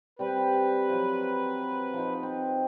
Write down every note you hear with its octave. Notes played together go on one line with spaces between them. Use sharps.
G3 C4 B4 G5
C5
F3 F#3
F3 D#4
C4